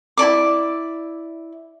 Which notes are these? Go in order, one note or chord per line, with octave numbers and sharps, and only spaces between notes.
E4 A4 D5 D6